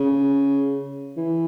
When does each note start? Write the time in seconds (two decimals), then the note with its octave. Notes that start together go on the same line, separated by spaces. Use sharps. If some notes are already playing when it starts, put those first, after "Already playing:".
Already playing: C#3
1.17 E3